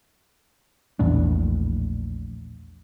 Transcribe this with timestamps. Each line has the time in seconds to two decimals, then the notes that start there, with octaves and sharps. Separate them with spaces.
0.99 A#1 E2 A2 D4